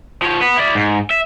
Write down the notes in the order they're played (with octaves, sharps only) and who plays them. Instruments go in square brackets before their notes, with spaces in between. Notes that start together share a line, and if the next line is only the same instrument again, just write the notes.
[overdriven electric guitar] F3 C#5
B3
E4 D5
G#2
E5